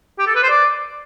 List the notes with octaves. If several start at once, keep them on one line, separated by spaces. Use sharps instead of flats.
G4
A4
B4
C5
D5